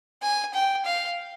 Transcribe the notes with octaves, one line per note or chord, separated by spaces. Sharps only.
G#5
G5
F5